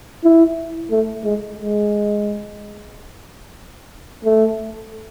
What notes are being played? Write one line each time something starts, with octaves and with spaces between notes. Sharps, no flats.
E4
A3
G#3
G#3
A3